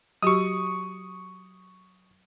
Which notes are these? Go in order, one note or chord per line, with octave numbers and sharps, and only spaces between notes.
F#3 F#4 G4 C#6 D#6